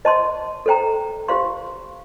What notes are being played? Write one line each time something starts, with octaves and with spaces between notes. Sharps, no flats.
C5 D#5 A5 C6
A4 C5 G5 A#5
G4 C5 F5 C6